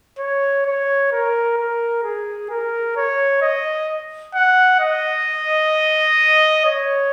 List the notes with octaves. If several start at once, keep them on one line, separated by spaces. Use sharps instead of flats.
C#5
C#5
A#4
A#4
G#4
A#4
C#5
D#5
F#5
D#5
C#5